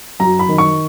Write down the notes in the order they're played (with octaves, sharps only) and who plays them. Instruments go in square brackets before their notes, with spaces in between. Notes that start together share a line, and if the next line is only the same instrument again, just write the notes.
[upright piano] F#2 A#5
B5
D#3
C#6